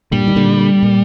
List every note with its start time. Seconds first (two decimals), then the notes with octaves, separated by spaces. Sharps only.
0.12 G2 A#2 G3
0.28 D#3
0.36 A#2 D3
0.83 A#2